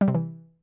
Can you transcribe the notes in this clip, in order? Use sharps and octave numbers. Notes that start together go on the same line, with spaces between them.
G3
C3
E3